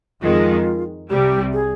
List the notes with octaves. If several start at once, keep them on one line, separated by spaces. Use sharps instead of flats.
F2 D#3 G#3 F4
C2 C3 G3 G4
G#4